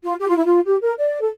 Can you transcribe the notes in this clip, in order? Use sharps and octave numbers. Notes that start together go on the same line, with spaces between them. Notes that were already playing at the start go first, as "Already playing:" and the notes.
F4
G4
F4
E4
F4
G4
A#4
D5
A4